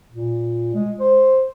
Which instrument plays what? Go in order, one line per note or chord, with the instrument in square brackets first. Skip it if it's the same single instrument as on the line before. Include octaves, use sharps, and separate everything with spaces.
[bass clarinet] A#2
G#3
C5